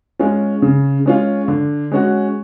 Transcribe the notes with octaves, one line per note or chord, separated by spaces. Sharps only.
G#3 C#4 F4
C#3
G#3 C#4 F4
D3
G#3 C#4 F#4